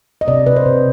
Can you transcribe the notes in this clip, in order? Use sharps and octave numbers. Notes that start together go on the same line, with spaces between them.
D#5
C3 D5
C3 B4
C5
C3